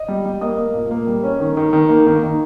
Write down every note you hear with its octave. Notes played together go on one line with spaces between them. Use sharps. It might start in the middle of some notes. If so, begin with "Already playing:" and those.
Already playing: D#5
G3
G3
A#3 D#5 D#6
A#3
A#2
A#3
G3
C#4
D#3
D#3
D#3
A#3
D#3
D#3